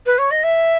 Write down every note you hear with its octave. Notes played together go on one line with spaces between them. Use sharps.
B4
C#5
D#5
E5